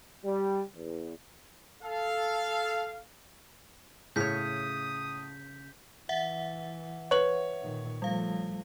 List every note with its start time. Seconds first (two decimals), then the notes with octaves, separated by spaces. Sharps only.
0.25 G3
0.75 E2
1.83 A4 F5
4.16 A2 C#3 C#5 D#6 G6 B6
6.09 E3 E5 F#5
7.11 B4 C#5 F#7
7.61 A#2 D#3
8.02 F3 G3 A3 F5